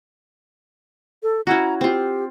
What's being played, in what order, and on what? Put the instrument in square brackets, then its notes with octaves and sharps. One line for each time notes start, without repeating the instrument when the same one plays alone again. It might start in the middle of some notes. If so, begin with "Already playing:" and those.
[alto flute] A4
[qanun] C#4 E4 F#4 [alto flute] A#5
[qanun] C4 F4 [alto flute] G4